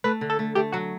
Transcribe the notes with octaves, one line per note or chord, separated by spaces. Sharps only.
A3 B4
D3
A4
A3
A3 G4
F#3 F#4